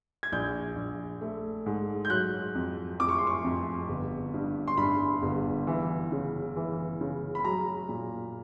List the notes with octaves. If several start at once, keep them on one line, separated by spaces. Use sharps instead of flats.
G#6
A#1 G6
A#1
A3
G#2
G6
F#3 F#6
F2
F2 D6
C#6
C6
C#6
F2
G1
G2
C6
G2 B5
G1
E3
C#3
E3
C#3
B5
F#3 A#5
A#2